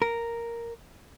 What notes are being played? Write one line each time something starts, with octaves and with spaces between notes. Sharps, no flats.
A#4